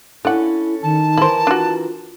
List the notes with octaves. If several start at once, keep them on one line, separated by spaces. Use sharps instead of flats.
C#4 D4 E4 A4 F#5
D#3 A5
E3 E4 A#4 C5
D4 F4 F#4